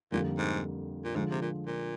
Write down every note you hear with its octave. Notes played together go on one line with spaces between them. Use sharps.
F2 A#2 D3 G3 A#3
G#2
A#2
G#2 D3 F3 G#3
C3
A#2
A#2